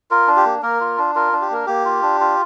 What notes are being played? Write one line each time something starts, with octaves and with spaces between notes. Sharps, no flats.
F4 A#4
D4
G4
A#3
A#3 A#4
F4
D4
F4 A#4
D4
G4
A#3 A#4
A#3 G4
F4
D4
F4